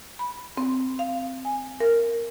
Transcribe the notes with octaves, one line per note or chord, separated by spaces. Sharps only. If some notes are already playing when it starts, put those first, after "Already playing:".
B5
C4
F5
G#5
A#4